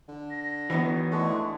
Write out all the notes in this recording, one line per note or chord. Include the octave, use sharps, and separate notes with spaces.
D3
A#6
D#3 E3 F#3 B3 E4
A2 D3 G#3 D4 C#6